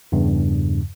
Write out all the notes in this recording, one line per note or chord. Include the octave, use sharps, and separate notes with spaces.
E2 G2 C#3